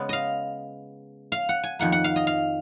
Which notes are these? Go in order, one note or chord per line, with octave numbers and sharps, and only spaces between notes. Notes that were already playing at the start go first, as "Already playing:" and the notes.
Already playing: C#3 G#3 B3
D#5 F5
F5
F#5
G#5
F2 D#3 A#3 F#5
F#5
F5
D#5
F5